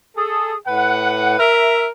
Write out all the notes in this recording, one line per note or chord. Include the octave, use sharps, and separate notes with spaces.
G#4 A4
A2 B4 F#5
A#4 E5